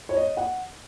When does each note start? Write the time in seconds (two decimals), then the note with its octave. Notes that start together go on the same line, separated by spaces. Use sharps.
0.09 C#5
0.17 D#5
0.37 F#5